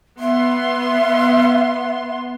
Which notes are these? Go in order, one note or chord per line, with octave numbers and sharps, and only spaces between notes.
B3 E5 C6